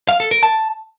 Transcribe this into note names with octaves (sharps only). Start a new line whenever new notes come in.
F5
A4
A#4
A5